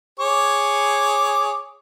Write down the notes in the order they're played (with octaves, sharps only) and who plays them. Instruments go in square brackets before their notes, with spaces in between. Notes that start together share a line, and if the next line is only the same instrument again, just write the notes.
[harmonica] G#4 C#5 D6